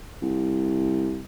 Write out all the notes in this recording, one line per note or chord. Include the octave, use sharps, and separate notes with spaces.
C2